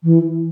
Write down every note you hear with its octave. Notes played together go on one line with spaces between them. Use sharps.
E3